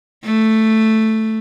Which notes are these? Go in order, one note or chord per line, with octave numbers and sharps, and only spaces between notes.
A3